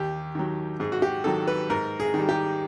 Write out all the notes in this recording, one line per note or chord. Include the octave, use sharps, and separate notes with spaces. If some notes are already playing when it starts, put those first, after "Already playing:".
Already playing: D#2 G4
D#3 F#3
G#2 G#4
F#4
G4
D#3 F#3 A4
B4
G#2 A#4
G#4
D#3 G3
G4